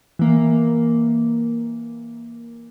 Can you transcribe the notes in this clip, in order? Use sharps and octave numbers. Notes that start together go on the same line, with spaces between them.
E3 A#3